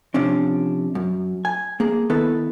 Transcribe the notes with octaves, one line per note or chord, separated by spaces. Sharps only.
C3 F3 C#4 D4
F#2
G#5
A#3 G#4
D#3 B3 E4 A4 B4